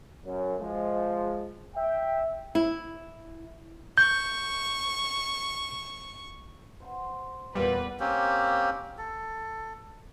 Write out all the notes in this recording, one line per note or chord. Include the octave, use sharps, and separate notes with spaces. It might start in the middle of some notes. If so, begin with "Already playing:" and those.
F#2
F3 G#3
E5 G5
E4
C#6 G6
C5 F#5 C6
E2 A#2 G3 F#4 B4
A#3 C4 C#4 G4
A4